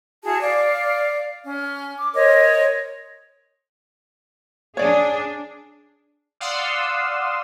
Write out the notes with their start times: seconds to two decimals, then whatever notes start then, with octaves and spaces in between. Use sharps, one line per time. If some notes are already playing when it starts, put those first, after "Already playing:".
0.23 E4 F#4 G#4 A5
0.42 D5 F5
1.45 C#4
1.98 D6
2.15 A#4 C5 C#5 D#5
4.77 D4 G#4 C#5 D5
6.40 D5 F5 F#5 C6 D#6 E6